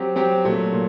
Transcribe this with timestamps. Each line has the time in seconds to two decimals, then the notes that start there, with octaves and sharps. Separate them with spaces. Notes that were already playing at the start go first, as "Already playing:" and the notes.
Already playing: F#3 C4 G4
0.16 F#3 C4 G4
0.44 A#2 F#3 A3
0.72 A#2